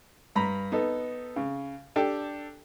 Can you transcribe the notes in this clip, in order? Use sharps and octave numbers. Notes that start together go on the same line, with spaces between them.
G2 A#5 B5
B3 D#4 A4
C#3
D4 G4 A4 G5